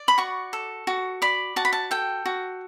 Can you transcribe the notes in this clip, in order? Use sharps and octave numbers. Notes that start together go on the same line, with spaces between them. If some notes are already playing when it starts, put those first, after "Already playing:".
Already playing: D5
B5
F#4 C#6
A4
F#4
D5 B5
F#4 A5
B5
A5
A4 G5
F#4